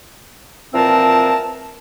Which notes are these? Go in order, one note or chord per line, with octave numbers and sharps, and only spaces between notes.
A#2 E3 F3 C4 A#4 A5